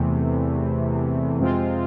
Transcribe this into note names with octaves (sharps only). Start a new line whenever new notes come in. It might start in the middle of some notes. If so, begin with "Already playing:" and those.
Already playing: E2 C3 E3 A3
F2 C3 G#3 C4 F4